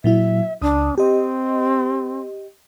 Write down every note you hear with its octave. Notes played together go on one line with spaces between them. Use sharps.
A#2 F#3 E4 E5
C#2 D4 D#6
C4 G4 D#5